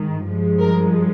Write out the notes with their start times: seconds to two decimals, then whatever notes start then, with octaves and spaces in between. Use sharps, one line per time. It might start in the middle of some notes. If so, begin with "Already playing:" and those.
Already playing: G#2 D#3
0.25 G2 F3 G#3
0.61 A#4